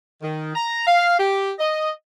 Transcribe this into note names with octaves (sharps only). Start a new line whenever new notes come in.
D#3
A#5
F5
G4
D#5